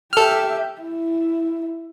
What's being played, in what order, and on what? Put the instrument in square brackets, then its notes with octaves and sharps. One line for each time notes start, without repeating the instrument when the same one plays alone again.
[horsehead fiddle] G4 E5 [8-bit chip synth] A4 F6
[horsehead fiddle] E4